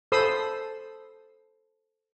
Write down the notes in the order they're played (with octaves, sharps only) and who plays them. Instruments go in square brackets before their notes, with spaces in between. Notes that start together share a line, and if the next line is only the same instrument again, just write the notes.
[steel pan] A4 C5 B5 C6 D#6 E6